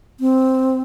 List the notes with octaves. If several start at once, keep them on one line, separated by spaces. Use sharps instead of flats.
C4